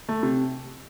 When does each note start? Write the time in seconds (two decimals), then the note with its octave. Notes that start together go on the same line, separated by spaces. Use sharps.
0.09 A3
0.23 C3